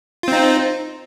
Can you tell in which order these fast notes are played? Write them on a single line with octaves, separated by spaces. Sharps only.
F4 C4 D#4